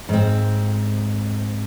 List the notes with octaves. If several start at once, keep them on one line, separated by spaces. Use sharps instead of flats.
G#2 C4